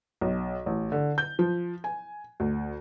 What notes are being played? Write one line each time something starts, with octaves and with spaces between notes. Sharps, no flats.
B1
A1
D3
G6
F3
G#5
D2